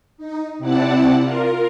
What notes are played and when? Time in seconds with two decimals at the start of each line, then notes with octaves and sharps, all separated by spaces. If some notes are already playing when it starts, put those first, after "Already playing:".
0.18 D#4
0.59 C3 C4 E4 D5 F#5 A5
1.20 F4 A#4